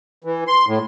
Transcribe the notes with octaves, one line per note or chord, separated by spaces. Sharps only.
E3
C6
A2